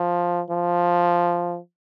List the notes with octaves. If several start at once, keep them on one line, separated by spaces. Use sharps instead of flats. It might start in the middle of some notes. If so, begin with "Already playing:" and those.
Already playing: F3
F3